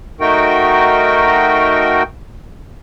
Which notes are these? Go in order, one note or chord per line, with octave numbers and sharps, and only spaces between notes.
A3 D#4 F#4 A#4 G5